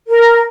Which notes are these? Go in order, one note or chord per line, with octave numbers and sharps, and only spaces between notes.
A#4